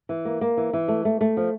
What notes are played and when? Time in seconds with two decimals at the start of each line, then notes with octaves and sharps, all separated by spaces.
0.09 E3
0.25 A#3
0.41 A#3
0.57 E3
0.73 E3
0.88 A3
1.05 A3
1.21 A3
1.37 F3